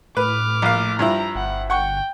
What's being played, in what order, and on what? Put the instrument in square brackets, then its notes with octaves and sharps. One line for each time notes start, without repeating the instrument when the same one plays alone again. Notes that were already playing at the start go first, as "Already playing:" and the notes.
[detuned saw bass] A2 [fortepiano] B4 [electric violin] D6 F6
[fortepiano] A#1 F5
[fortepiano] G2 F3 E4 [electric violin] A#5
[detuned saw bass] G1 [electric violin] F#5
[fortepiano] F#5 C#6 [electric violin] G5